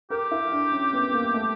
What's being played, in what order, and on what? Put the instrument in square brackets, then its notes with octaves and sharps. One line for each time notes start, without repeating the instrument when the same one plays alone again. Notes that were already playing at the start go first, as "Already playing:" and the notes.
[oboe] G4 [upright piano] A#4
[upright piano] E4
D4
C#4
B3
A#3
A3